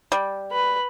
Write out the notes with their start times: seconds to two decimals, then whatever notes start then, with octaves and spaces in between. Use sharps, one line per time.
0.12 G3
0.52 B4